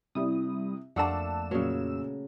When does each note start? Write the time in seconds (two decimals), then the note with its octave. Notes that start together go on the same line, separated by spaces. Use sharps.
0.15 C3 G3 E4 D#6
0.96 F2 A3 A#3 D4 F#5 A5 E6 E7
1.51 A#2 C#3 F#3